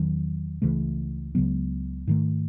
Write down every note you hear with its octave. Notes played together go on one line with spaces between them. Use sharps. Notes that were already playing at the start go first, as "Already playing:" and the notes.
Already playing: E2 D#3 F#3
C#2 C#3 E3 A3
C#2 C#3 F#3 B3
G#2 D#3 A3